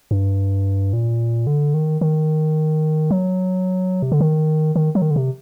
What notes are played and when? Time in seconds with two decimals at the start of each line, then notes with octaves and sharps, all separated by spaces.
0.11 G2
0.93 A#2
1.47 D3
1.74 D#3
2.01 D#3
3.11 F#3
4.02 C3
4.12 D3
4.21 D#3
4.76 D#3
4.95 F#3
5.02 D#3
5.11 D3
5.16 C3